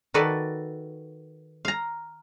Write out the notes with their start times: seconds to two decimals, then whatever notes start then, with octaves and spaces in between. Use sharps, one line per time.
0.14 D#3 F#4 A4 B4 D5
1.65 F5 A#5